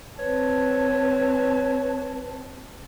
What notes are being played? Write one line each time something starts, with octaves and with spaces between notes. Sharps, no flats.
C4 B4 C#5 A5